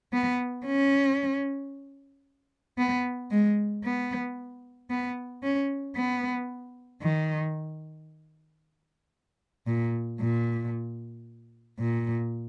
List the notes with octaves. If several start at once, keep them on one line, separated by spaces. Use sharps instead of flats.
B3
C#4
B3
G#3
B3
B3
C#4
B3
D#3
A#2
A#2
A#2